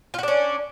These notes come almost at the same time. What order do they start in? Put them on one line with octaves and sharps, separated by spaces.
F4 F#4 D4 C#4